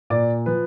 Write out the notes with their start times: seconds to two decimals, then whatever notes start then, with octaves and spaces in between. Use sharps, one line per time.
0.10 A#2 D5
0.46 F3 B4